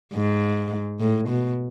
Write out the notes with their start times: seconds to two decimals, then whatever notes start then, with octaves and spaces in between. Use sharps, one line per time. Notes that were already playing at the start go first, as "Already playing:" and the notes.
0.14 G#2
1.00 A2
1.29 B2